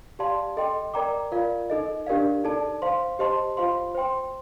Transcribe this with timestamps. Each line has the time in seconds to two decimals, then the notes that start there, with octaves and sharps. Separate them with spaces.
0.19 G4 D5 F5 A5 C6
0.57 A4 D#5 G5 C6
0.94 A#4 D5 G5 A#5 D6
1.32 F4 A#4 D5 F5
1.70 D#4 A4 D#5
2.07 D4 G4 A#4 D5 F5
2.44 D#4 A4 D5 A5
2.82 C5 F5 C6
3.19 G4 C5 D#5 A5 C6
3.57 F4 C5 F5 C6
3.95 C5 G5 C6